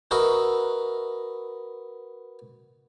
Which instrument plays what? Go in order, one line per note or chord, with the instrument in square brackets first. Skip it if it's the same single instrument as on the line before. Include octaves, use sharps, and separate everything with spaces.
[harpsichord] F#4 A#4 B4 D#5 E5